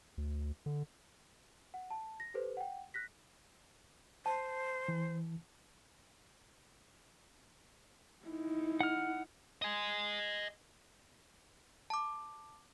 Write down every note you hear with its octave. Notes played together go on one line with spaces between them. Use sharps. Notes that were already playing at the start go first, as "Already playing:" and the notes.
D2
D3
F#5
A5
A#6
G4 A4 B4 C5
F#5 G5
F#6 A#6 B6
C5 A5
E3
D#4 E4
F#5 F6
D#5 G#5
A5 D6